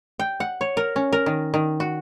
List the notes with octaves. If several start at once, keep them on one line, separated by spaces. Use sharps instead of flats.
G5
F#5
C#5
A#4
C#4
A#4
D#3
D#3
F#4